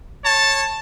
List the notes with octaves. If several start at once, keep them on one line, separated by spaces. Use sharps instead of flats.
C#5 A5